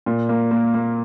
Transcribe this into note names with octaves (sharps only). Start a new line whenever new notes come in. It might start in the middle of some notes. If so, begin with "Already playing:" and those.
A#2
A#3
A#3
A#3